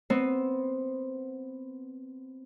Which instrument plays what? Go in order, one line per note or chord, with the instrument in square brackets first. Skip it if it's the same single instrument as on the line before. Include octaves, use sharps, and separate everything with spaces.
[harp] B3 C4